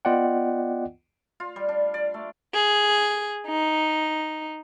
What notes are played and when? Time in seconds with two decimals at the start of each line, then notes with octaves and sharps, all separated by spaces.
0.05 B3 F4 D5 D#5 F#5 G5
1.40 F4
1.56 G3
1.69 D4
1.94 D5
2.14 A3
2.54 G#4
3.48 D#4